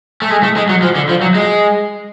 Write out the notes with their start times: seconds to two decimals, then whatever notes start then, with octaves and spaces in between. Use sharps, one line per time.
0.22 A3
0.30 G#3
0.43 A3
0.57 G#3
0.69 F#3
0.82 F3
0.95 D3
1.09 F3
1.21 F#3
1.35 G#3